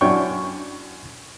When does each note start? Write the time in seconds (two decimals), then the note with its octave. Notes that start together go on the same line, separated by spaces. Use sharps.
0.01 F#2 D4 E4 C#5 G5 C#6